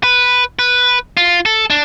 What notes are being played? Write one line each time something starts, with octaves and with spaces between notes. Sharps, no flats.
B4
B4
F4
A4
D4